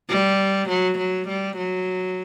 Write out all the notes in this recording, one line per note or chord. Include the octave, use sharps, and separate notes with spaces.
G3
F#3
F#3
G3
F#3